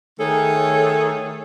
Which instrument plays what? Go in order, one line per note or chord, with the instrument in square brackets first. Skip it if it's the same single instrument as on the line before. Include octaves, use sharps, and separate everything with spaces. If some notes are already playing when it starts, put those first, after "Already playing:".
[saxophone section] D#3 A3 G#4 A4 C#5